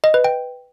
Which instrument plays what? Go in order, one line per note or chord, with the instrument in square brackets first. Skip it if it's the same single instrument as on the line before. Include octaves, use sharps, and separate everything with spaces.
[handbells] D#5
B4
G5